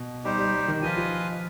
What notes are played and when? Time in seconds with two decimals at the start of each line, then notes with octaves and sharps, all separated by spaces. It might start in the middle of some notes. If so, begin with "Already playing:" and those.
Already playing: B2
0.25 G3 D#4 G4 C5
0.39 G3
0.54 G3
0.68 D#3
0.82 F3 F4 B4 D#5 G#5
0.97 F3